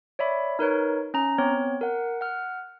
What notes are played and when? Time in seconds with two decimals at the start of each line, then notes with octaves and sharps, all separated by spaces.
0.19 C#5 D5 E5 B5
0.59 D#4 A#4 B4 C#5
1.14 C#4 A#5
1.38 B3 C4 C#5
1.81 A#4 F#5
2.21 F#5 F6